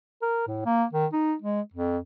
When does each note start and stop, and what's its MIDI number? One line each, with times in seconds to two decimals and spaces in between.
0.22 0.45 70
0.47 0.65 45
0.66 0.85 58
0.93 1.06 51
1.13 1.35 63
1.42 1.61 56
1.73 1.98 41